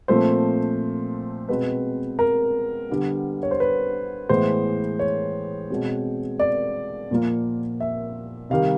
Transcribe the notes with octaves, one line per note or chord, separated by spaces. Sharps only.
A#2 F3 A3 C4 C5
B2 G#3 C4 B4
A#4
D3 G3 B3
C#5
C5
B4
A2 E3 G#3 B3 C5
C#5
B2 G#3 C4
D5
A#2 F3 A#3
E5
C3 D#3 G3 F5